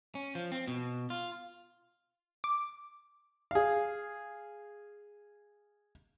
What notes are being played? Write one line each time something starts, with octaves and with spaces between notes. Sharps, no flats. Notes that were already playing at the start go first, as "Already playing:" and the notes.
C#4
F3
C4
B2
F4
D6
G#4 F5